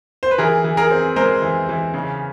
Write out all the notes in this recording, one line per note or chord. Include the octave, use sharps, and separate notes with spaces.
C5
B4
E3 G#4 A#4
E3
G#4 A#4
C4
G#3 A#4 C5
E3
E3
C#3